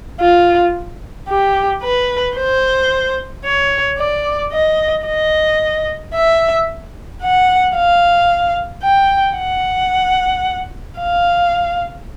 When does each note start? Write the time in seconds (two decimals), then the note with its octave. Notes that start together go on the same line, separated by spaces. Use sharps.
0.21 F4
1.29 G4
1.83 B4
2.36 C5
3.45 C#5
3.98 D5
4.53 D#5
5.07 D#5
6.14 E5
7.22 F#5
7.76 F5
8.84 G5
9.38 F#5
10.99 F5